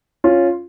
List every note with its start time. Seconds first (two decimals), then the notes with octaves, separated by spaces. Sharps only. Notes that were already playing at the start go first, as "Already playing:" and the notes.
0.24 C#4 F4